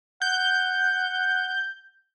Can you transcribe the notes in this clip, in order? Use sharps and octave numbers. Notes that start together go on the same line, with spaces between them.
F#5 G6